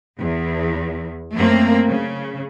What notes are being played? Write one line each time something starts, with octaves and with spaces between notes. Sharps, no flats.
E2
F#2 A3 A#3 C4
C#3